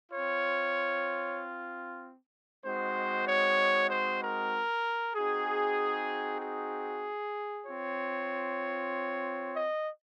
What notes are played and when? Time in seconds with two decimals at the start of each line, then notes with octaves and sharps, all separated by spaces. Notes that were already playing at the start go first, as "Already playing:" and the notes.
0.12 C4 F4 C#5
2.64 G#3 C4 D#4 F#4 C5
3.27 C#5
3.90 C5
4.22 A#4
5.16 C4 D#4 F#4 G#4
6.41 G#4
7.66 C4 F4 C#5
9.55 D#5